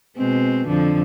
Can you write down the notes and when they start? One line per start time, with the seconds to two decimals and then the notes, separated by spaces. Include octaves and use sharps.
0.17 B2 G#3 C4
0.68 F2 D3 F3